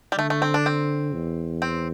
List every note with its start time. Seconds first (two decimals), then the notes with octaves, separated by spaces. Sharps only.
0.12 G3
0.18 D3 A3
0.30 A3
0.42 C4
0.54 D4
0.66 C4
1.14 E2
1.62 C4